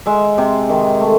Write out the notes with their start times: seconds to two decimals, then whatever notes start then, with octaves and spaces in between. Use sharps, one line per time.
0.06 G#3 E5
0.38 C3
0.69 D#3
1.01 A3